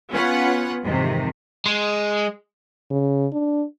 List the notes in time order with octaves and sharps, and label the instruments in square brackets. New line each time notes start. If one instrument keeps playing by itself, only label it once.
[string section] B3 C#4 F4 B4 F#5
F2 G#2 C3 D#3 E3
[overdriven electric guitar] G#3
[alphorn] C#3
D4